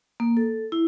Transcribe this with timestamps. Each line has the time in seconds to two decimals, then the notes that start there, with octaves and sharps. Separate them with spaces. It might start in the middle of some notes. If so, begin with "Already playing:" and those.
0.20 A#3
0.37 A4
0.72 E4